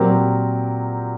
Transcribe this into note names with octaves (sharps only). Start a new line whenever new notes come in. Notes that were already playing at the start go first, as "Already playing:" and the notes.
Already playing: A#2 F#3 C4 G4 A#4